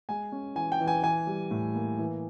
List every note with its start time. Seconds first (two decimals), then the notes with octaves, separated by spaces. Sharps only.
0.09 G#3 G#5
0.32 C#4
0.55 E3 G#5
0.72 G5
0.80 E3
0.87 G#5
1.03 E3 G#5
1.27 G3
1.51 A2
1.75 A#3
1.99 E3